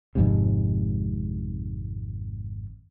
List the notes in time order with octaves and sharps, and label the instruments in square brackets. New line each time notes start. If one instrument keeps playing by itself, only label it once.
[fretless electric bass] G#1 F2 G#2 C3